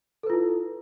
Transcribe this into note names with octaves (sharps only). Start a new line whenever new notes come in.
E4 F4 A4 B4